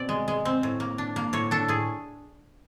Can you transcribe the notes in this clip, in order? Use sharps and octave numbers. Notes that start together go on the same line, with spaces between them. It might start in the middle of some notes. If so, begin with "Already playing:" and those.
Already playing: B2 C4 D5
G#3
G#3
C4
A2
A#3
D4
A#3
A2 C#5
D4 A4
A2 G#4